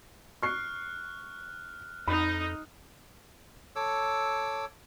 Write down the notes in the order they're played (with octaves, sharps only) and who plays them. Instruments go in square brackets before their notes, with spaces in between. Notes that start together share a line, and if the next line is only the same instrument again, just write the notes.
[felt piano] C#6 C7 [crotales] F6 F#6
[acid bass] F2 [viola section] D#4 [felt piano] B5
[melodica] A4 C#5 D6 E6